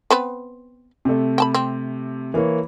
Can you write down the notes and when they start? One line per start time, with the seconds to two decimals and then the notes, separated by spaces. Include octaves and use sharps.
0.10 B3 C4 B4
1.05 C3 A3
1.38 G5 A5 B5
1.54 C4
2.34 E3 A#3 C#5